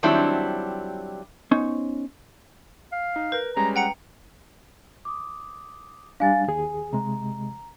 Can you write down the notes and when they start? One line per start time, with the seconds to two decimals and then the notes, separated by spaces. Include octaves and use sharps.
0.03 D#3 F#3 G3 C4 D4 E4
1.51 B3 C#4 D#4 C5 C#5
2.92 F5
3.16 D#4
3.32 A#4 B4 G6
3.57 G3 G#3 C#4 A#5
3.76 F#5 G5 A#5 C#7
5.05 D6 D#6
6.20 G3 D4 F5 G#5 A6
6.48 D#2 G#4 G#5
6.93 C3 G#3 A#5